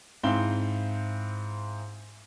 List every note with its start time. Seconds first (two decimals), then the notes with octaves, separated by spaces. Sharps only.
0.23 G#2 C4 E4 F5 G7